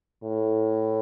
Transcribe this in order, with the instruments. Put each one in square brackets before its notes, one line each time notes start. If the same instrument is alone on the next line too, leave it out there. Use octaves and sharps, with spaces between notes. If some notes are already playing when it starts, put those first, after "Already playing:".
[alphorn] A2